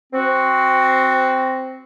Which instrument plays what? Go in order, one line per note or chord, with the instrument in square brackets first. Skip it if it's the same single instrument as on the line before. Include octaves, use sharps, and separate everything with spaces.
[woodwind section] C4 F#4